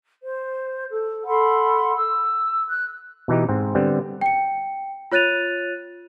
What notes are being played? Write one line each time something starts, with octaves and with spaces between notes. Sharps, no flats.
C5
A4
A4 F#5 B5 C6
E6
F#6
B2 E3 D#4 G4
G#2 C4
D3 G3 B3 C4
G5 C#7
F4 C#5 F#6 A6 D#7 F7